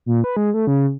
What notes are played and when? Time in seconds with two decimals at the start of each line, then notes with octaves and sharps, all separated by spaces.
0.06 A#2
0.24 B4
0.37 G#3
0.54 A3
0.67 C#3